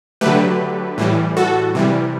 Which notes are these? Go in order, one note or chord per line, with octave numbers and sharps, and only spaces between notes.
D3 F#3 A3 G4 B4
A2 E3 G3
F#4 A4
C3 E3 G3